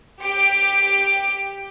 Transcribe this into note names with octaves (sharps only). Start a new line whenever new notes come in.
G4 D7